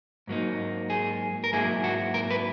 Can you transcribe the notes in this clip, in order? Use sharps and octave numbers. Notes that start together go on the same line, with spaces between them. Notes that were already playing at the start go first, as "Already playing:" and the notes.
G#2 F#3 A#3 D#4
G#4
A#4
G#2 F#3 A#3 E4 G#4
F#4
A#4
B4